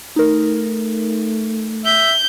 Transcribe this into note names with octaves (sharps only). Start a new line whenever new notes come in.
A3 D#4 A#4
E5 G6